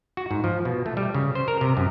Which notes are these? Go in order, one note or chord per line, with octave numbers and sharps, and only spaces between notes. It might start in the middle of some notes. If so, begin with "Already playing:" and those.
F#4
G#2
F3
B2
A3
G3
C#3
C5
A#4
C3
F#2